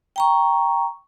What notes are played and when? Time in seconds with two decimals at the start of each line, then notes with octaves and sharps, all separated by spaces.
0.16 G5 A#5 C#6